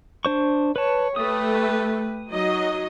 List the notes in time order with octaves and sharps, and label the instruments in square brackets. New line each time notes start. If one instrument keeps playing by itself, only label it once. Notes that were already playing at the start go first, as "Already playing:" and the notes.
[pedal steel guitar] D4 C5 C#6
[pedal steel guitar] B4 A5 [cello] C#5
[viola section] A3 [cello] G4 B4 [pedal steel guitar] D#6
[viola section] F#3 D#5 [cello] D#4